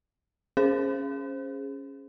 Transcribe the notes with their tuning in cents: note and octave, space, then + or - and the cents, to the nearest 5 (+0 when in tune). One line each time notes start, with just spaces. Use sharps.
C#4 +0 G#4 +0 C5 +5